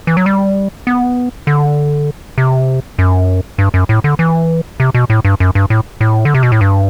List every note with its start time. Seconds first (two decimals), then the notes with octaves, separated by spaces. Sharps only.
0.07 E3
0.17 F#3
0.26 G3
0.87 B3
1.47 D3
2.38 C3
2.99 F#2
3.58 G2
3.74 F#2
3.89 A2
4.04 D3
4.19 E3
4.80 C3
4.94 B2
5.10 A2
5.25 G2
5.40 F#2
5.55 G2
5.70 A2
6.01 A2
6.25 D3
6.34 C3
6.43 B2
6.52 A2
6.61 G2